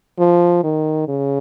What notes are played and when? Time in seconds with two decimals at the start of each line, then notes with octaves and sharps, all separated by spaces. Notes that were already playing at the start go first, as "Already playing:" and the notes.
0.19 F3
0.63 D#3
1.08 C#3